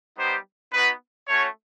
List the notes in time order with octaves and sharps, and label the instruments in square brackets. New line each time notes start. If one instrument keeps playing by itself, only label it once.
[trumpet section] G3 B3 D#4 G4 C5
B3 D#4 F#4 B4
A3 C#4 F#4 C#5